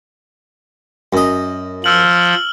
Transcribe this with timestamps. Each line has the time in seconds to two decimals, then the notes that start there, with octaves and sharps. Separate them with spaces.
1.13 F#2 D#5
1.84 F3 E6 F6 F#7